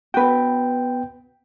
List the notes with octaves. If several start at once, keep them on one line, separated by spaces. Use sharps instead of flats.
B3 F#4 B4 G5